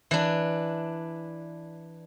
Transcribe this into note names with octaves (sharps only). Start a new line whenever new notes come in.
E3 D4